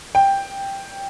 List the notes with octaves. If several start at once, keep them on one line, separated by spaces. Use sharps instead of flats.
G5